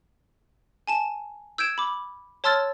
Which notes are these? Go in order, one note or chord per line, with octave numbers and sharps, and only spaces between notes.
G#5 A5 E7
E6 G6 G#6 D7 E7
B5 D6
C#5 A5 C6 E6 F6 A6